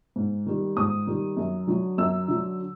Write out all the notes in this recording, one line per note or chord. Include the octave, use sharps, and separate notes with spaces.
G#2
D#3 G3
G#2 D#6
D#3 G3
F#2
D3 F#3
F#2 E6
D3 F#3